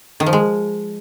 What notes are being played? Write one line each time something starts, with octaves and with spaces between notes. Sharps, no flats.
D#3
F3
G#3